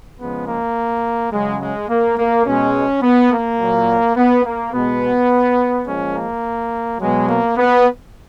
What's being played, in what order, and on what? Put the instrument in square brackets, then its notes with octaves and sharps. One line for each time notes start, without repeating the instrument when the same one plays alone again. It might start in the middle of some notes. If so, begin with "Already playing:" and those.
[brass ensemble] C#3 F3 G#3 B3
A#3
C#3 F#3 G#3
G#3
A#3
A#3
B2 G#3 C#4
B3
A#3
A#2 F#3
B3
A#3
B2 G#3 B3
A#2 F3 G#3 C#4
A#3
B2 F#3 G#3
A#3
B3